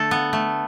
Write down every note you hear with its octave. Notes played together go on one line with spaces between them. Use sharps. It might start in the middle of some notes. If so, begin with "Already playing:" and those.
Already playing: D3 A3 A4
B3
A3